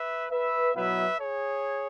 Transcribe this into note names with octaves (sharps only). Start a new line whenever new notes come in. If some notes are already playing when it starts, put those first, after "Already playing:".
Already playing: B4 E5
B4 E5
B2 F#3 B3 E4 B4 E5
G#4 C#5